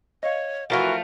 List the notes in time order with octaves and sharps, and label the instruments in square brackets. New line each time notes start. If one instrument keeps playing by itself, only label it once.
[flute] C#5 [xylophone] D#5 F5
[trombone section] E3 F#4 [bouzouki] F3 A3 F4 [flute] A#4